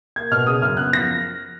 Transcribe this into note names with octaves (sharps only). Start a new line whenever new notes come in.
A#3 G#6
B2 F6
C#3 D#6
F#2 F6
B3 F#6
F3 A#6